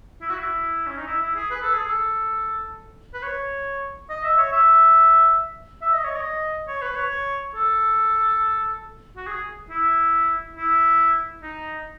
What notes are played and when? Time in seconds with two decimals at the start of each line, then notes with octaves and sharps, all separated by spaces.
0.21 E4
0.30 F#4
0.39 E4
0.87 C#4
0.97 D#4
1.07 E4
1.22 E4
1.36 G#4
1.51 B4
1.62 A4
1.74 G#4
1.86 A4
3.14 B4
3.23 C#5
4.10 D#5
4.24 E5
4.38 C#5
4.53 E5
5.82 E5
5.94 D#5
6.05 C#5
6.16 D#5
6.68 C#5
6.82 B4
6.96 C#5
7.55 A4
9.17 F#4
9.27 G#4
9.70 E4
10.57 E4
11.43 D#4